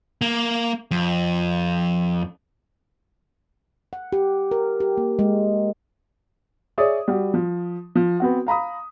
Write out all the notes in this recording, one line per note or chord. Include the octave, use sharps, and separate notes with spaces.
A#3
F2
F#5
G4
A#4
G4
A#3
G#3
G#4 C#5 D5 E5 D#6
G3 F#4
F3
F3
B3 C4 F#4
F5 A#5 B5 D#6